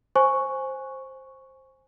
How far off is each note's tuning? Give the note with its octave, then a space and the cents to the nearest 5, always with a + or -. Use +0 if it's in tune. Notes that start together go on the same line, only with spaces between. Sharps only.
C5 +10 G#5 +0 C#6 +0